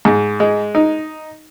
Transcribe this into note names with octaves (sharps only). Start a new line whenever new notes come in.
G#2
G#3
D#4